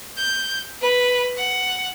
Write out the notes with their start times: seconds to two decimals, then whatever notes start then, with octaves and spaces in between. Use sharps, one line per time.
0.18 G6
0.81 B4
1.38 F#5